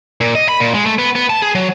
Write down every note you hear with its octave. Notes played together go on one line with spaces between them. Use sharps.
A#2
D#5
B5
A#2
G#3
A3
B3
B3
A5
G#4
F#3